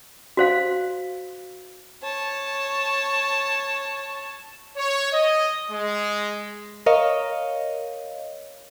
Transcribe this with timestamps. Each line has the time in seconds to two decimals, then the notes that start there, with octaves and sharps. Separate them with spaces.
0.37 F#4 C5 F5
2.03 C#5 A5
4.77 C#5
5.13 D#5
5.71 G#3
6.86 A#4 C#5 D#5 F5